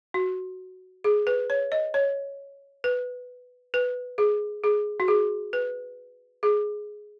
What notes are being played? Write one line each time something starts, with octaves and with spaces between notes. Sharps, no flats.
F#4
G#4
B4
C#5
D#5
C#5
B4
B4
G#4
G#4
F#4
G#4
B4
G#4